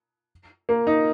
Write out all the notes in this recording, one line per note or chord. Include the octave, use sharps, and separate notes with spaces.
A#3
D#4